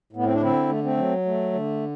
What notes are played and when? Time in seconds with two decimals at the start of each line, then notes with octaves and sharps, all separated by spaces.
0.13 A2 B3
0.25 C4
0.33 D4
0.41 D3 C4 E4
0.69 A3
0.84 A3 C4
0.97 F#3
1.25 A3
1.53 D3